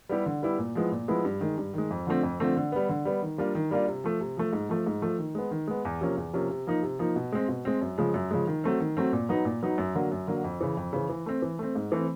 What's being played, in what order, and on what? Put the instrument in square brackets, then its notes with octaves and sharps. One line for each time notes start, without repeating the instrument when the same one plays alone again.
[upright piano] G3 B3 E4 G4
D3
G3 B3 E4 G4
A#2
F3 G#3 B3 E4
A#2
F3 G#3 B3 E4
G2
D#3 G#3
G2
D#3 G#3
F2
D3 F3 A3 C4
F2
D3 F3 A3 C4
D3
G3 B3
D3
G3 B3
D#3
G3 A#3 D4 F4
D#3
G3 A#3 D4 F4
C3
F3 A3
C3
F3 A3
G#2
F3 A3
G#2
F3 A3
D#3
G#3 B3
D#3
G#3 B3
E2
C3 F3 A#3 C#4
E2
C3 F3 A#3 C#4
C3
F3 A#3 D#4
C3
F3 A#3 D#4
B2
G#3 C4
B2
G#3 C4
F#2
C#3 F3 G#3
F#2
C#3 F3 G#3
D#3
F#3 A3 C4
D#3
F#3 A3 C4
A#2
F#3 B3 D#4
A#2
F#3 B3 D#4
F#2
D3 F#3 A#3
F#2
D3 F#3 A#3
F2
C#3 E3
F2
C#3 E3
E3
A3 C4
E3
A3 C4
G#2
E3 A3 C4